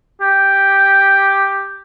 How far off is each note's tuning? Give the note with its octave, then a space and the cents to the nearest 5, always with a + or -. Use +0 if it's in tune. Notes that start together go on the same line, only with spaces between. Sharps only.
G4 +0